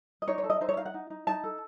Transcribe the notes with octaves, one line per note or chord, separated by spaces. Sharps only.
D#5
D#4 C#5
C#5
A4
D#5
D#4 C5
C#5
D#4 F5
F#5
D#4
D#4
D#4 A5
A4